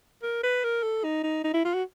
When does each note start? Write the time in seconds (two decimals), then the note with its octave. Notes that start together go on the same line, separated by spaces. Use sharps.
0.22 A#4
0.43 B4
0.64 A#4
0.83 A4
1.04 D#4
1.23 D#4
1.44 D#4
1.54 E4
1.65 F4
1.74 F#4